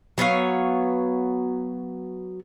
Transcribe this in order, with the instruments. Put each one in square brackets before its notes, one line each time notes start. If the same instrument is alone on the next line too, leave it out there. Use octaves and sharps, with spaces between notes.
[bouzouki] F#3 B3 C#5 F5